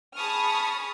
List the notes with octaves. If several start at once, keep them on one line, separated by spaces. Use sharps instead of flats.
G#4 A5 B5 C#6 D#6 F6